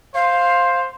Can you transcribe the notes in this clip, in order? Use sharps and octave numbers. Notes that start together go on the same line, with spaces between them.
C5 F5